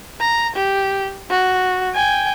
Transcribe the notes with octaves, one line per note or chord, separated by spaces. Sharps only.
A#5
G4
F#4
G5 G#5